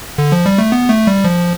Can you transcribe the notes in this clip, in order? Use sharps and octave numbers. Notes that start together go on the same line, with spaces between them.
D3
F3
G3
A3
B3
A3
G3
F3